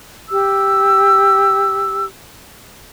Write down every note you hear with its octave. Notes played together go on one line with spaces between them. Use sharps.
G4 E6